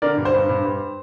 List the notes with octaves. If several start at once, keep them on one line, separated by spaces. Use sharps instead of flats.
D3 A#4 D5
G2
C5
G2
G2
G2